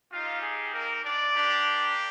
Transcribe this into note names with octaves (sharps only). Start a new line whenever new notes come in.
C4 D#4 F4 G4 F5
G#4
A#3 A#4
D4 D5
A#3 D4 G4